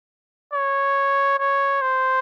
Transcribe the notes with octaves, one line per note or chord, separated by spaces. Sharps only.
C#5
C#5
C5